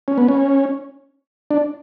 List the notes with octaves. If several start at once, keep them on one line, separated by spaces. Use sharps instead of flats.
C#4
B3
C#4
D4